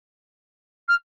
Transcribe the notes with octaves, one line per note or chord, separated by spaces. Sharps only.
F6